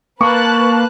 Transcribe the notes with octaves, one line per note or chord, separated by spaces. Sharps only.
A#3 B4 A5 C#6 F#6